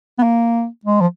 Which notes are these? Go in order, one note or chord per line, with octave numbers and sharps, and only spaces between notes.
B3
A#3
G#3
F3